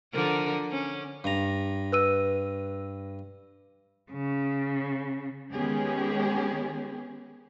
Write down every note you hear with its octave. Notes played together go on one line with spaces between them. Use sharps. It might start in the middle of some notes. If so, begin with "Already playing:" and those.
D3 F3 A#4
C#4
G2 A#5
B4 E6 D#7
C#3
D#3 G#3 B3 C#4 G4 G#4